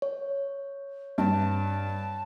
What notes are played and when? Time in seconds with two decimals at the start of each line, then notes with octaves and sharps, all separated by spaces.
0.02 C#5
1.18 G2 A5